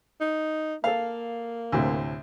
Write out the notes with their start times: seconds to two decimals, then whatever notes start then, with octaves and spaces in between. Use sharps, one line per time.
0.21 D#4
0.84 A#3 A4 F5
1.72 D2 A2 C3